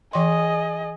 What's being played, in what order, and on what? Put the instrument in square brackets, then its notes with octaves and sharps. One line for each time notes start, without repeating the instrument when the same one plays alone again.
[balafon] E3 G5 C6 [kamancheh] G#4 D#5